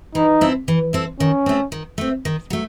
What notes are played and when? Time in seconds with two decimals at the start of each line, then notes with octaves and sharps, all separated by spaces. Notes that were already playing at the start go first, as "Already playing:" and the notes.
0.15 E3 D#4
0.41 C4 E4 A4
0.68 E3
0.93 C4 E4 A4
1.19 D#3 C#4
1.46 A3 C4
1.72 D#3
1.98 A3 C4
2.25 D#3
2.50 F#3 A3